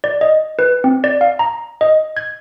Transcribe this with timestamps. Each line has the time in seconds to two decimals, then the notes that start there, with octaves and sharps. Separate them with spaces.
0.04 D5
0.21 D#5
0.59 B4
0.84 C4
1.04 D5
1.21 F5
1.39 A#5
1.81 D#5
2.17 G#6